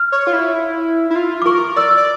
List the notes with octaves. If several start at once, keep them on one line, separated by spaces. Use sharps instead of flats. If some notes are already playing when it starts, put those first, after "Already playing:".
Already playing: F6
C#5
F4
E4
E4
F4
D6
A#4 C#6
D5 E6
D5